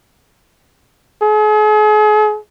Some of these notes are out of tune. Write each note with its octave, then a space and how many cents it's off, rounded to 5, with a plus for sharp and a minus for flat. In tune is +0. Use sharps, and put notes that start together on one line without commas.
G#4 +40